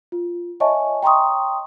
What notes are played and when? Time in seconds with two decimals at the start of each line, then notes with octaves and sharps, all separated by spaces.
0.12 F4
0.60 C#5 D#5 E5 G#5 A5 C#6
1.03 G5 A#5 C6 C#6 D#6